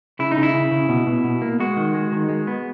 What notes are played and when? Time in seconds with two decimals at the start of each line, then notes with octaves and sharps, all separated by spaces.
0.19 C#3 E4
0.32 D#4
0.37 C#3
0.43 E4
0.54 C#3
0.71 C#3
0.89 B2
1.06 B2
1.24 B2
1.41 A#3
1.60 G#3 F#4
1.77 D#3
1.94 G#3
2.12 D#3
2.29 G#3
2.47 B3